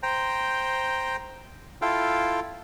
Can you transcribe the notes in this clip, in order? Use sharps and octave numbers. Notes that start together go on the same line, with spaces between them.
C5 G5 A#5
E4 F4 A4 F5 G5